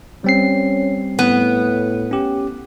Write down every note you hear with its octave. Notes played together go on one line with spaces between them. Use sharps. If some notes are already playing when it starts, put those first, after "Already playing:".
G3 C4 C#4 C7
A2 B3
C#4 G4